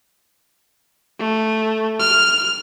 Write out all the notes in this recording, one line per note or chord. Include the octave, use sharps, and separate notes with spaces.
A3
F6